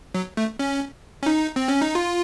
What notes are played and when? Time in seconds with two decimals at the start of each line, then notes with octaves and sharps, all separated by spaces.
0.14 F#3
0.37 A3
0.59 C#4
1.23 C#4
1.26 D#4
1.56 C4
1.68 C#4
1.81 D#4
1.95 F4